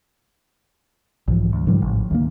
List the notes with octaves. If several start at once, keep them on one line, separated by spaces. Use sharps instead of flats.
B1 G#2 E3 F3
D2
G#2 C#3 F3 G3
A1
D2 D#3 A#3